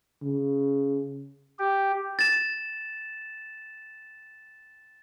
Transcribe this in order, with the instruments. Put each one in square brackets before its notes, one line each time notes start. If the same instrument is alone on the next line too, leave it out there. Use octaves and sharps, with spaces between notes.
[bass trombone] C#3
[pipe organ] G4
[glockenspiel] A6 E7